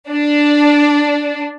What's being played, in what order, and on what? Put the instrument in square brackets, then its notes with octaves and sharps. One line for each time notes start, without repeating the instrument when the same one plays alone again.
[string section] D4